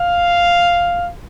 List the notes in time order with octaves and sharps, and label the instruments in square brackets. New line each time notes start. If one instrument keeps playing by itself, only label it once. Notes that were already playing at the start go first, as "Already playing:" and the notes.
Already playing: [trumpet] F5